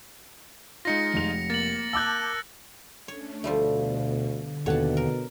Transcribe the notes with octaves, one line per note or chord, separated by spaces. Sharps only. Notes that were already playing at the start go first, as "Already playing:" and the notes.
G#3 D#4 F4 A#6 C#7
F1 F7
A#3 A6 F#7
A5 D6 E6 F#6 G6
A3 C#4 D4 C#5
D2 B2 F3 G3 A3
D3
D#2 B2 A4 C#5 F#5 A5
A#4